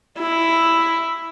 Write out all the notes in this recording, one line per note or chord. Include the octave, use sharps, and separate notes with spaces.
E4